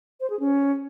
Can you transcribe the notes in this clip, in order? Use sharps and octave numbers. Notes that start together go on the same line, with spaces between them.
C5
G#4
C#4